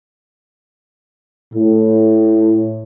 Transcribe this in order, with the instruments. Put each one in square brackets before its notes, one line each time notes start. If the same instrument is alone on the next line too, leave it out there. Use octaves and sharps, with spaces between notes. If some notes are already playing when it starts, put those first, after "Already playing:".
[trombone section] A2